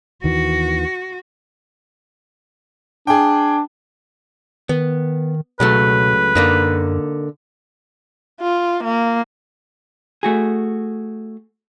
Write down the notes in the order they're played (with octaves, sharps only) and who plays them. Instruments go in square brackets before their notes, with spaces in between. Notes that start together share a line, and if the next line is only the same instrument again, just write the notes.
[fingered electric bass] D#2 D#3 E3 [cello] F#4
[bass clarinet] D4 [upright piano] G#4 G5
[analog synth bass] D#3 [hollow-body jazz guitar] B3
[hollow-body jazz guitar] C#2 F#3 A3 [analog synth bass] B2 [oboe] B4
[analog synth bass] F#2 [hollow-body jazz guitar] D3 A#3 D#4
[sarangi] F4
A#3
[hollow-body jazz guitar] A3 F#4 G#4